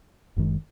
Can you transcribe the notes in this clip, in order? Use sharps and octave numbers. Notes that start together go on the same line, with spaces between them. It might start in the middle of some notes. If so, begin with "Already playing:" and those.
F#1 F#2 D#3 G#3